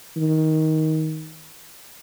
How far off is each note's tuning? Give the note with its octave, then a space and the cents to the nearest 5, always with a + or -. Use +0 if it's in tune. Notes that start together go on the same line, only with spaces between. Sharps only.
D#3 +15